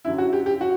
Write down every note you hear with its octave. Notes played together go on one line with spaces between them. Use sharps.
F#2 D3 F#3 E4
F#4
G4
G4
F#4